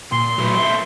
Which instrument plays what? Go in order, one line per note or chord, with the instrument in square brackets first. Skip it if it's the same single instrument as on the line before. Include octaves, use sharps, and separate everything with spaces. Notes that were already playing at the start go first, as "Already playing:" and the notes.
[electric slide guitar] A#2 [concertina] C6
[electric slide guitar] F#3 A3 B4
A4 A#4 E5